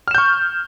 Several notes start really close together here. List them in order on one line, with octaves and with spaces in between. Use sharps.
F6 E7 G6 C#6